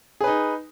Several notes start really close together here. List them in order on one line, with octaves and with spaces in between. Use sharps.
G#4 B4 D#4